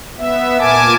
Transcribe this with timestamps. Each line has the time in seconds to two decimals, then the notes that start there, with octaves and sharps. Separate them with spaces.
0.18 B3 E5
0.59 A#2 A#4 G#5 A5 D6